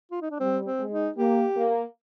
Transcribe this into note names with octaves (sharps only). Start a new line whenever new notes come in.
F4
D#4
D4
G3 C4
C4
G#3
D#4
A#3 G4
A#3